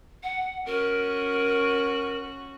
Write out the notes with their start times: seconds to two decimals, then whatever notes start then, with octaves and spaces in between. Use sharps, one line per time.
0.23 F#5
0.66 C#4 F#4 A#4